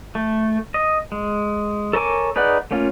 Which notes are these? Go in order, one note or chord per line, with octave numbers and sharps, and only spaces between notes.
A3
D#5
G#3
A4 A#4 C#5 G#5 D6
D#4 G#4 B4 D5 F#5
A3 A#3 C#4 F4